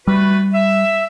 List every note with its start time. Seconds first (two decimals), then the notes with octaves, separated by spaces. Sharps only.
0.07 G3 A3 F#4 B4
0.54 E5